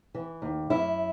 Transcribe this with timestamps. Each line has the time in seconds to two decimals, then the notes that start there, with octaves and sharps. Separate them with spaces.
0.14 E3
0.42 D#2
0.70 F#2 E4